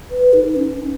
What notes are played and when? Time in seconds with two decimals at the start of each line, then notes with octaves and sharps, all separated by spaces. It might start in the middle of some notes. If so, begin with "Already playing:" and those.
0.11 B4
0.33 D#4
0.56 C#4